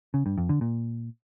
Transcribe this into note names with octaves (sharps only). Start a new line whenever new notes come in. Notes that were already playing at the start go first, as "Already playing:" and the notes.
C#3
G2
F2
D3
A#2